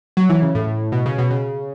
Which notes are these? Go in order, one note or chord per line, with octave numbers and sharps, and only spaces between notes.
F#3
E3
C#3
A2
B2
C#3
B2
C#3